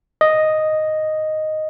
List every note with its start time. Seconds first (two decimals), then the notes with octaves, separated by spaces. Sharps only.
0.21 D#5